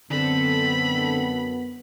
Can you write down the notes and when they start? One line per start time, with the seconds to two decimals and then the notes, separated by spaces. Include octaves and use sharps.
0.10 F#2 D3 B3 C4 A4 B5